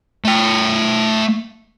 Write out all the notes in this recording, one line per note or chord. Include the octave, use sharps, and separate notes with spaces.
A3 G5